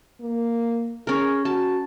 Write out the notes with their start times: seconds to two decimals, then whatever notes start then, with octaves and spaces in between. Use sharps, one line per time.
0.21 A#3
1.07 C#4 G#4 A#4
1.45 F#4 A5